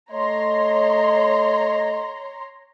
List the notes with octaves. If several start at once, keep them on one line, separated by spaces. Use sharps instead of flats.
A3 C#5 D#5 A#5 C6